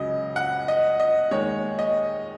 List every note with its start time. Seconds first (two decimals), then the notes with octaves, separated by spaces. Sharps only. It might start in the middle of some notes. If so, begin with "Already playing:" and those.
Already playing: C#2 C#3 F#3 D#5
0.36 F#5
0.68 D#5
1.00 D#5
1.31 D#2 D#3 G#3 C#5
1.79 D#5